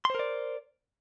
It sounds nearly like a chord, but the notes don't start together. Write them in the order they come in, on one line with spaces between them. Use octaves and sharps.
C6 C5 A#4 D5